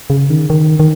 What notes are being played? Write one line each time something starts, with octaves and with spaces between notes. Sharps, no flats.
C#3
D#3
D#3
D#3